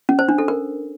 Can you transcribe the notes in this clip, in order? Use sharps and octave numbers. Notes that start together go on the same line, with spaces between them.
C#4
C5
D4
A4
A#4